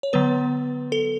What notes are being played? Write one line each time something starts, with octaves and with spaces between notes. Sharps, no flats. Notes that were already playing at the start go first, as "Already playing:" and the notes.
C#5
D3 F#3 B3 B4
A4